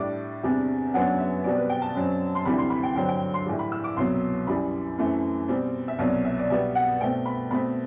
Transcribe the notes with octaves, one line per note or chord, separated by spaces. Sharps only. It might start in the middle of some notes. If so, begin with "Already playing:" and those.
Already playing: A2 G3 D4 D6
E2 C3 G3 D4
F#2 F#3 B3 D4 F#5
E5
B2 G3 C4 D5
B4
G5
A5
F#2 F#3 C4
C6
D2 C3 E3 G3 B5
C6
B5
G5
G2 D3 F#3 C4 G5
G5
C6
A2 E3 G3
B5
E6
D6
C2 B2 F#3 C6
F#2 E3 G3 B5
F#2 E3 A3 C4
B2 G3 C4
E5
C2 B2 F#3 D5
E5
D5
B2 G3 B3 E5
F#5
B2 A3 C4 G5
B5
B2 A3 C4 B5